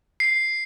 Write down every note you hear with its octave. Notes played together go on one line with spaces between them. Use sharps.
C7